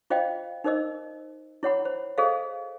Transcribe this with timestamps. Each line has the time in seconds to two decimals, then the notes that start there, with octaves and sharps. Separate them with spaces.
0.10 F4 C5 D#5 F5 G5
0.64 D#4 A#4 C5 D#5 E6
1.63 E4 C#5 F#5 B5
1.85 C5
2.18 G#4 A4 C5 D#5 F5